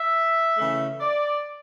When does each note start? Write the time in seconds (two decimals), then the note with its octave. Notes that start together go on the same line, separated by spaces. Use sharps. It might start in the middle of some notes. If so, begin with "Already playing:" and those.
Already playing: E5
0.57 C#3 E3 A3
1.00 D5